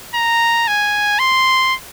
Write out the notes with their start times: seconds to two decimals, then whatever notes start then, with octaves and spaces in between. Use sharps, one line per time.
0.15 A#5
0.68 G#5
1.19 C6